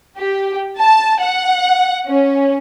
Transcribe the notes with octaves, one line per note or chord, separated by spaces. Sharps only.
G4
A5
F#5
C#4